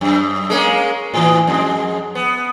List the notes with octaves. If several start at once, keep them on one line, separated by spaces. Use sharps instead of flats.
F#2
G#3 A#3 C#4
A2 E3
F2 G#3
B3